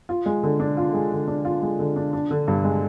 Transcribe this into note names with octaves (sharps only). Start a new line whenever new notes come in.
F4
G#3
D3
D4
F4
G#3
D3
D4
F4
G#3
D3
D4
D4
D3
G2
G#3